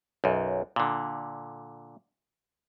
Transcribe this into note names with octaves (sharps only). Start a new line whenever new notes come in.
B1 F#2
A#2 D3